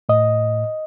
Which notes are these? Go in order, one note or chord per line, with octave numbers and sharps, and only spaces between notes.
A2 D#5